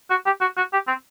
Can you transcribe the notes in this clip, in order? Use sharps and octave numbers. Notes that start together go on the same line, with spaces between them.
F#4
G4
F#4
F#4
G4
C4